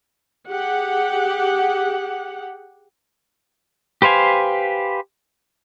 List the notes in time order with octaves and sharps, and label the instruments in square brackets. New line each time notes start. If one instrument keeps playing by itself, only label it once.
[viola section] G4 G#4 F#5
[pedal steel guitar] G4 B4 C5 F5 G#5